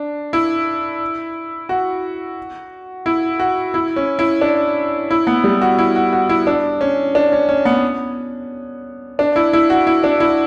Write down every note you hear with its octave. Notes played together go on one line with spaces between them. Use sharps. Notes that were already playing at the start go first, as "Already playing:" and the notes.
Already playing: D4
E4
F#4
E4
F#4
E4
C#4
E4
D4
E4
B3
G3
F#4
E4
F#4
F#4
E4
D4
C#4
D4
C#4
C#4
B3
D4
E4
E4
F#4
E4
D4
E4